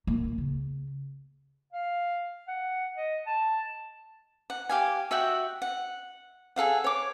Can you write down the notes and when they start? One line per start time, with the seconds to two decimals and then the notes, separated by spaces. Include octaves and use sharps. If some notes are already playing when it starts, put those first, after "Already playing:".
0.07 A#2 A#3
0.38 C#3
1.73 F5
2.48 F#5
2.97 D#5
3.26 A5
4.50 F#5
4.69 G4 F5 G#5
5.11 F#4 E5 F#5 G5
5.62 F#5
6.56 G#4 A4 F5 F#5
6.84 C#5 D6